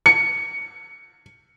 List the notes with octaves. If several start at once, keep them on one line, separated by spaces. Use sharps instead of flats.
C#7